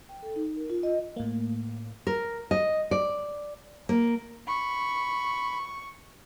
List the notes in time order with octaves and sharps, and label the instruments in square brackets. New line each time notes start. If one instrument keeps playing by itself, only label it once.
[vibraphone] G5
A4
D#4
A#4
F4
D#5
[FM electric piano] A2 A#3
[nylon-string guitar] A#4
D#5
D5
A#3
[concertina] B5 [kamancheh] C#6